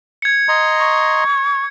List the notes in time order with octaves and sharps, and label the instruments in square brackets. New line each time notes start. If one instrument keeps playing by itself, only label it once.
[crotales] G#6 C#7
[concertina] D#5 A#5 C6
[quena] C#6